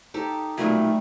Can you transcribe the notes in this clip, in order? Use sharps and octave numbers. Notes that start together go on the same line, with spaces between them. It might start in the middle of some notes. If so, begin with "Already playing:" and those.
D#4 G4 A4
B1 A#2 G3 A3 D#4